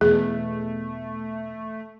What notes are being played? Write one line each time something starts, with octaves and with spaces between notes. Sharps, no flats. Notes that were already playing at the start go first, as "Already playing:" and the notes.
E2 B2 A3 G#4